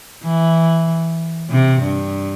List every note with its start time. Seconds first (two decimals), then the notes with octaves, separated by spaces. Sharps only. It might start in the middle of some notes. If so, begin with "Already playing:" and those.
0.23 E3
1.50 C3
1.82 G2